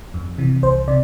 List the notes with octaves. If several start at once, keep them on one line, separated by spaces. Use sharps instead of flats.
F2
C3 E3
C2 C5
C3 D5